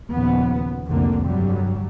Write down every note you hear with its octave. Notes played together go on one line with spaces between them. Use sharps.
D#2 A#2 C#3 F3 B3
F1 C2 D3 E3 A#3 C4
G2 D3 F#3 G3